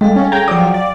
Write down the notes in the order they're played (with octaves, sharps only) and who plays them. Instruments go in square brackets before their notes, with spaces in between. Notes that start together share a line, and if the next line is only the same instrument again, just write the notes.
[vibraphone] G3 A4 F5 [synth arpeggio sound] G#3
[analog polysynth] C#4
[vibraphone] G#4 [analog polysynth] G5 A#5 [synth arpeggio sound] G6 G#6
[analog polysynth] F3 F#3 [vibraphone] D5 G5 [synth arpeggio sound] D6
[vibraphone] F5
[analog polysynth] D5